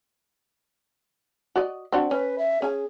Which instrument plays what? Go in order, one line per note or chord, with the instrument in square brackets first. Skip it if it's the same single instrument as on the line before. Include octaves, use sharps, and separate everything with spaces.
[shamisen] F#4 D5 D#5
C4 D4 F#4
[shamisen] C#4 [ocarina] B4
[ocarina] E5
[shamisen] C#4 G#5 [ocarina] G#4